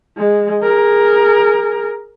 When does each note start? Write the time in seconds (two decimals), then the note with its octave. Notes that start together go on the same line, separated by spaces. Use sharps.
0.18 G#3
0.62 G#4 A#4